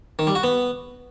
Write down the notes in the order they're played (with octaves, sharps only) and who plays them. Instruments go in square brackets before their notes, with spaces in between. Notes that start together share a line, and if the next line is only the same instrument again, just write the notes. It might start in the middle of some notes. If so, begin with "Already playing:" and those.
[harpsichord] D#3
G3
F#4
B3